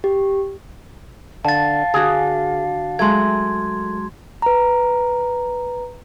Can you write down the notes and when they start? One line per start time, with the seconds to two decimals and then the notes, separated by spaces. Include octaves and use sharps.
0.04 G4
1.45 D3 F5 A5 A6
1.94 D3 F#4 G#4
2.99 F#3 G#3 A3 C6 G#6
4.42 B4 A#5